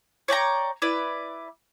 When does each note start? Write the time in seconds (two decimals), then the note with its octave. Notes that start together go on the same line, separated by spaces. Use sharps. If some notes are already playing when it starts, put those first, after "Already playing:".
0.28 C#5 D5 G5 A#5
0.82 E4 B4 D5